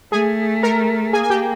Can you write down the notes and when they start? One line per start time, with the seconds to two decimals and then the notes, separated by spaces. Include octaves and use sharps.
0.12 A3 G#4 G#5
0.63 A#4 A#5
1.13 A#3 G#4 G#5
1.23 G#5
1.30 G4 G5